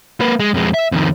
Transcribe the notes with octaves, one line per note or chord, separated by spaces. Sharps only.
A#3 B4
G#3
F2 G#3
E5
F2 D#3